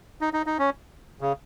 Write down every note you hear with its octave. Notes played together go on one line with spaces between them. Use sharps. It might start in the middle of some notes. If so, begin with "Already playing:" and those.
D#4
D#4
D#4
C#4
C#3